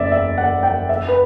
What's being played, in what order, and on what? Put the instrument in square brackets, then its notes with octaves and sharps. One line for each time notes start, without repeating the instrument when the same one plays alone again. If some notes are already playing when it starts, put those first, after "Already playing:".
Already playing: [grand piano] F#1 E2 [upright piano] D5 E5
[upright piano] E5
F#5
G5
E5
B4